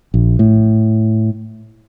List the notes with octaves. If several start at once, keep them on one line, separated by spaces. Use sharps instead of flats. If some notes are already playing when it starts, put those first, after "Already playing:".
A#1
A2